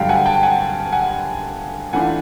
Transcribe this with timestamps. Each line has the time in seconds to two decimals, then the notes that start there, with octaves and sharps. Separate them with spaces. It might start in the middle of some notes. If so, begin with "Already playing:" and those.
Already playing: G2 D3 F#3 A3 F5 G5
0.09 F#5 G#5
0.26 G5 A5
0.43 F#5 G#5
0.92 F#5 G#5
1.93 E3 A3 D4 F4 F#5 G#5